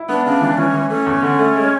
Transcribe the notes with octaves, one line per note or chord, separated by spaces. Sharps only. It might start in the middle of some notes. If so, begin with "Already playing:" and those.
Already playing: E4
B3 D4
C#3 D4
E3
E3 C#4
E3
A3 C#4
E2
D3
A3
G#3